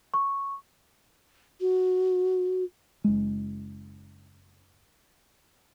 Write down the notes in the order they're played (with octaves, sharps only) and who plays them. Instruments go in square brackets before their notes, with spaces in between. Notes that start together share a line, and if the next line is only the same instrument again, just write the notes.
[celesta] C#6
[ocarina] F#4
[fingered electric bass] F#1 G#3